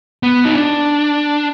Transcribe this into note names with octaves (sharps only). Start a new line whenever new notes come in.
B3
D#4
D4